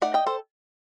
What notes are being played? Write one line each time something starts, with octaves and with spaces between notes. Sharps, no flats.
A3 D#4 D5 F#5
D#5 G5
A4 C5